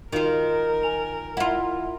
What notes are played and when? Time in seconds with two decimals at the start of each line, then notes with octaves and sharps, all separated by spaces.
0.13 D#3 D#4 F4 F#4 A#4 F5
0.83 G#5 F7
1.37 E4 F4 F#5